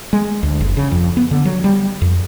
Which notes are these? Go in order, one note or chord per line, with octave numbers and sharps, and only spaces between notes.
G#3
D2
F#1
C#3
F2
B3
D3
F#3
G3
F2